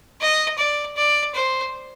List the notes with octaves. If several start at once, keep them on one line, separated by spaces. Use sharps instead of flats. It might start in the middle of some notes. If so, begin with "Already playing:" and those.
D#5
D5
D5
C5